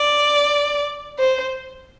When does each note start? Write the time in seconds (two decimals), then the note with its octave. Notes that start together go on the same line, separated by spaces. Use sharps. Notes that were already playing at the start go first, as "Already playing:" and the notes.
Already playing: D5
1.19 C5